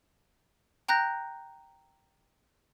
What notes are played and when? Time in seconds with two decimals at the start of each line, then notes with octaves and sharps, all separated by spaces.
0.88 G5 A#5 F#6 G6 A#6